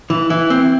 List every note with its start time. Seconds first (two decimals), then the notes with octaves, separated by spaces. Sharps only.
0.10 E3
0.30 E3
0.50 C4